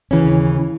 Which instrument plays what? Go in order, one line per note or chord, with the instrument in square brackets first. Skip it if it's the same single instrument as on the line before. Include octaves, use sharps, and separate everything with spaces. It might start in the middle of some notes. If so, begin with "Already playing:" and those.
[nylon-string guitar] D#2 C#3 E3 C#4